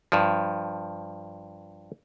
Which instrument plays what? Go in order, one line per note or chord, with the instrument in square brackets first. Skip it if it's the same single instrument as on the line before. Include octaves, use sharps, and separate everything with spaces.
[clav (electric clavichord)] G2 F3